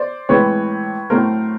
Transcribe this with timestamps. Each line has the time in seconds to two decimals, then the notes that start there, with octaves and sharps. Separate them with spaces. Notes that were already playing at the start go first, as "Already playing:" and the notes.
Already playing: C5 D5
0.29 A2 E3 G#3 C4 B4 C#5
1.10 A2 F#3 A3 C4 A#4 C5